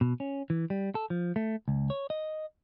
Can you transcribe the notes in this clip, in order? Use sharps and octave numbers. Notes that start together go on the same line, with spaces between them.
B2
C#4
E3
G3
A4
F3
A3
C#2
C#5
D#5